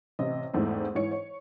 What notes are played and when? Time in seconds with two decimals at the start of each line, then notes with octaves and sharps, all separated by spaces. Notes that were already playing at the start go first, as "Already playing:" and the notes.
0.19 A1 C3 D#5
0.53 E2 G#2 A3 C4 E4
0.95 G#2 E3 C#5 C#7
1.11 C#5